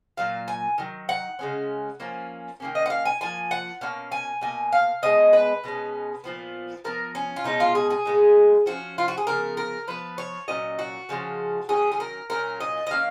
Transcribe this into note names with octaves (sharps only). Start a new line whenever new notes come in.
A#2 F#3 F5
G#5
D#3 F#3
F#5
C#3 G#3 C#4
F3 A#3 C#4
D#3 A#3 C#4
D#5
F#5
F5
G#5
F3 A#3 G#5
F#5
B2 A#3 C#4 F5
G#5
B2 A#3 G#5
F5
B2 G#3 B3 D#5
B4
B2 G#3 C#4
A#2 F3 B3
F3 B3 A#4
C#4
F4
B2 G#3 C#4 D#4
F4
G#4
G#4
A#2 G#3 B3
F3 A#3 C#4 F#4
F4
F#4
G#4
C#3 F3 B3 A#4
A#4
F3 G#3 B3 B4
C#5
A#2 F#3 C#4 D#5
F#4
C#3 F3 G#3 C#4
D#3 F#3 C#4 G#4
G#4
A#4
A#2 F#3 C#4 A#4
D#5
D#5
D#3 A#3 C#4 F5